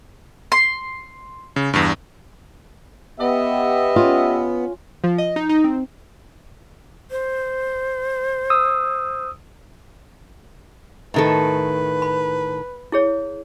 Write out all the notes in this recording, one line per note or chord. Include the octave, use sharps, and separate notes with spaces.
C6
C#3
E2 G2
B3 G4 D#5 E5
C#4 F4
F3
D#5
D#4
D#4
C4
C5
D#6 E6
A2 D#3 A4 B4
B5
E4 G#4 C#5